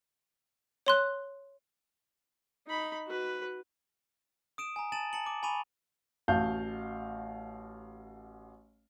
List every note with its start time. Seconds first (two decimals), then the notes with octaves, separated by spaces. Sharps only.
0.86 C#5 C6 F#6
2.67 D#4 B5
3.07 F#4 B4
4.58 D#6 D7 E7
4.76 G#5 A#5
4.92 G#5 A5 A6 D#7 E7 F#7
5.13 A5 A#5 C#7 F#7
5.26 D6
5.43 G#5 A#5 B5 C#6 D#7 F7
6.28 A1 F#4 F5 A5 G6